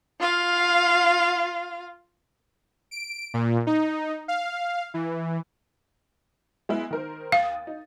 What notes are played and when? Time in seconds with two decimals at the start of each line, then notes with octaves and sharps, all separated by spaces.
0.20 F4 F5
2.91 D7
3.34 A#2
3.67 D#4
4.28 F5
4.94 E3
6.69 G#3 B3 E4
6.91 D#3 A#4 C5
7.32 D#2 F5 D#6 A6
7.67 D#4